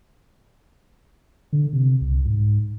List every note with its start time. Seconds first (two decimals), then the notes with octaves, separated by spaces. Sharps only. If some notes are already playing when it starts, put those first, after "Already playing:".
1.53 D3
1.73 C3
2.01 C2
2.25 G#2